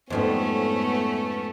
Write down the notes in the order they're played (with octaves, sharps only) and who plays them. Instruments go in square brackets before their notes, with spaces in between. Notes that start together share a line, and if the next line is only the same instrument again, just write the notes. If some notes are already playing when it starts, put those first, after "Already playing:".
[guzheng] F2 G#2 G3 [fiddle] A3 C#4 [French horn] B3